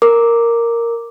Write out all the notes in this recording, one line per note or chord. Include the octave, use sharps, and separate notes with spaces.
A#4 D6